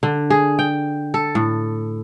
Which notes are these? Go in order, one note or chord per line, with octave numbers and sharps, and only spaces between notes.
D3
G#4
G5
A4
A2